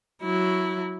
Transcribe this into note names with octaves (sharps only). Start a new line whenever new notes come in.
F#3 E4